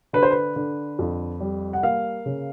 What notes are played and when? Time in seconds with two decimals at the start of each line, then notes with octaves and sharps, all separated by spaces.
0.13 D3 B4
0.23 C5
0.31 B4
0.56 D3
0.99 F2
1.40 G3
1.73 F#5
1.83 A#3 F5
2.26 C#3